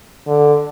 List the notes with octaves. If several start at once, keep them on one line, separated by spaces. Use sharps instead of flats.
D3